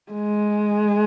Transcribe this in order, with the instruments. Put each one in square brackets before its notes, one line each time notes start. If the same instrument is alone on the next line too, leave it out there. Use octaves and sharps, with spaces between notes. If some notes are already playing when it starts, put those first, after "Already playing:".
[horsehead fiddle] G#3